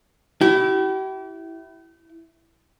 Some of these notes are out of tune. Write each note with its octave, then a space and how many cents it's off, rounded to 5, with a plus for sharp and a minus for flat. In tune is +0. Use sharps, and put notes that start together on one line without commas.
E4 +0 G4 -40